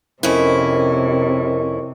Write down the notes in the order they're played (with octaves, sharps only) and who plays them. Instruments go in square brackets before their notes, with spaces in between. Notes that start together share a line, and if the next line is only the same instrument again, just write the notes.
[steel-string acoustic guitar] F2 C#4 E4 [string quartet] C3 [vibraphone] A#4 D#5 C#6